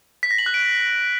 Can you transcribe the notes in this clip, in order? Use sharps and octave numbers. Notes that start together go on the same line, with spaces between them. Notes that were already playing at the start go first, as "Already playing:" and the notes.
B6
A#6
F#7
F#6
D7